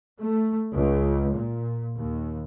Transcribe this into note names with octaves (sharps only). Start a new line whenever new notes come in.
A3
C#2
A#2
D#2